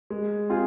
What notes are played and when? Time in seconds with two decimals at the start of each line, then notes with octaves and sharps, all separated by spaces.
0.10 G#3
0.50 C4 F4 G#4